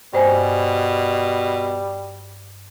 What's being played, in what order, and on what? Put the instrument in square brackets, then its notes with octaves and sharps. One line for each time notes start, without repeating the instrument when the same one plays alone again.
[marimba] G2 C5 G#5 [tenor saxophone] B2 [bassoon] G3